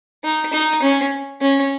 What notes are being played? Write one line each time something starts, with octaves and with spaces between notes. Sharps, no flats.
D#4
D#4
C#4
C#4